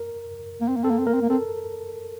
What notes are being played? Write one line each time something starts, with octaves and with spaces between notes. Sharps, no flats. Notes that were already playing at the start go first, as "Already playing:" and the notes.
Already playing: A#4
A#3
C4
A#3
C4 A4
A#3
C4
A#3 A#4
C4
A#3
C4 A4